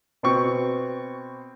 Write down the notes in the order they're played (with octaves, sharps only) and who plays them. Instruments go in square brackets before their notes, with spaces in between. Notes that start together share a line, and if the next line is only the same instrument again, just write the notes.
[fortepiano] B2 C4 C#6